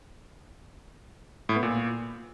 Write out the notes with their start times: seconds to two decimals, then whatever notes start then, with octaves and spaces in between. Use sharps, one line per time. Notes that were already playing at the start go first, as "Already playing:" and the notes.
1.49 A2
1.56 B3
1.63 A#2